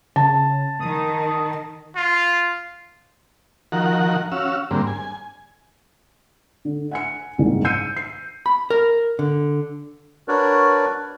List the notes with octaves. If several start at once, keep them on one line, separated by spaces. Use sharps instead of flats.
C#3 A5
D#3 D#6
F4
D#3 F3 F#4 A#4 F#5
C#4 F#4 F5 E6
G#2 D3 G3 A#3 C4
G#5
D3
F#5 G#5 C#7
F#1 C2 G#2 D#3
E6 G6 C7 C#7 D#7
C7
B5
A#4
D3
D4 F#4 A#4 B4 C#5 D5